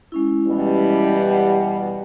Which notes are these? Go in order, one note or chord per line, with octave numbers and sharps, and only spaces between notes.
G#3 C#4 E4
B2 E3 G3
F#5